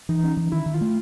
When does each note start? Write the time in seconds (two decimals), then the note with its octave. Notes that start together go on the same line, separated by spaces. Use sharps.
0.09 E3 D#4
0.24 C#4
0.37 E3
0.52 D#3 E4
0.66 D#3
0.74 F4
0.81 A3